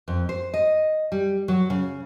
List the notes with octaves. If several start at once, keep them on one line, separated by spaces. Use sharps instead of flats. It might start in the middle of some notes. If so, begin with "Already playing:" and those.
F2
C5
D#5
G3
F#3
C#3